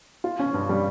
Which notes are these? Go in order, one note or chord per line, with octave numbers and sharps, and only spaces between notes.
F4
C#4
G2
G3